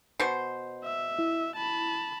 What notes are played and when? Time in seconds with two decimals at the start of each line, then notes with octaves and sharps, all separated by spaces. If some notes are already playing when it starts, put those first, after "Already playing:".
0.20 B2 C5
0.84 E5
1.19 E4
1.56 A5 B5